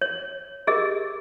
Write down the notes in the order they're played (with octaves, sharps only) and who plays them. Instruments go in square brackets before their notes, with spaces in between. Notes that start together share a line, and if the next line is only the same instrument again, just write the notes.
[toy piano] C#5
G4 G#4 A#4 D#5